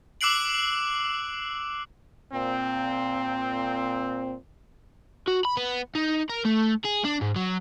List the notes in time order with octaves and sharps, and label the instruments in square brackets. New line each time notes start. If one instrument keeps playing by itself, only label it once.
[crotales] D6 E6 F#6 C7 D7 F#7
[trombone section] A#2 C4
[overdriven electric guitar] F#4
B5
B3
D#4
A#4
A3
G#4
D4
G#2
F#3